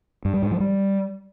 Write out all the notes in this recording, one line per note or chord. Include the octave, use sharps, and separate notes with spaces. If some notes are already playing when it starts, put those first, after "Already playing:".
G2
G3
G#2
F3
G3